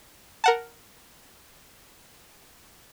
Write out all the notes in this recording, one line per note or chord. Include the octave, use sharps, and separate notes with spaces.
A#4 F#5 A5